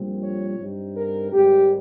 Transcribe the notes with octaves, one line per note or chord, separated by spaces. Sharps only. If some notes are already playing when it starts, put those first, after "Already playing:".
Already playing: A#1 A#2 G3 C4
C#5
G2 G3 C4 D#4
A#4
G#1 G#2 G3 G4